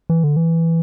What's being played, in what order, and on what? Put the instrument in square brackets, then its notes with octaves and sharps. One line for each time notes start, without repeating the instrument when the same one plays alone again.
[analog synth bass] E3
D3
E3